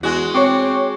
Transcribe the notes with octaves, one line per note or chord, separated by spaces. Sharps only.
E2 G#3 F#4
C4 C#5 C#6 D6